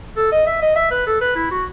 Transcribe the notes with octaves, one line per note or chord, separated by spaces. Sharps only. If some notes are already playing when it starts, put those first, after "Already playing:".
A4
D#5
E5
D#5
E5
B4
A4
B4
E4
F#4